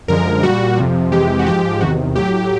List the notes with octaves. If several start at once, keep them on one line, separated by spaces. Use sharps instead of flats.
F#2 D3 F3 G#3 A#4
A#2 G3 F#4
F2 C3 F3
F2 C3 E3 G#3 G4
F#4
G#2 F3 G#3 G4
E2 C3 D#3 F#4
A2 F#3 G4